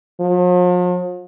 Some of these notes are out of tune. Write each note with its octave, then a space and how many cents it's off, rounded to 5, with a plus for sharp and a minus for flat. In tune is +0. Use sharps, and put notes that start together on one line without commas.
F3 +45